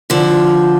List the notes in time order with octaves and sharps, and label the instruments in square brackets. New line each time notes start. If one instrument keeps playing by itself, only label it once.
[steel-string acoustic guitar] D3 F3